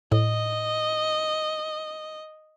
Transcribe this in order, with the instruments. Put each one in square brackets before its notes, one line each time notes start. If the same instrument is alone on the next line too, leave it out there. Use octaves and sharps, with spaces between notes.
[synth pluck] A2 [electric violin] D#5